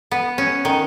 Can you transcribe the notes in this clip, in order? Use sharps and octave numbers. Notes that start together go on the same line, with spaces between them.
B3
C#4
D#3